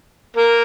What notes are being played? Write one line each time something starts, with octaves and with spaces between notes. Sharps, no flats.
A#3 A#4